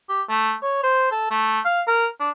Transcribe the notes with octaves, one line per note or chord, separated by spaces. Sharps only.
G4
A3
C#5
C5
A4
A3
F5
A#4
D4